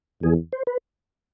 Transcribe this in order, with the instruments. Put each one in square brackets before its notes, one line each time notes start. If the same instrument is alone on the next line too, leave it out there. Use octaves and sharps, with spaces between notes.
[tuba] E2 [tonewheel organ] G#4
[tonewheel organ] C5
B4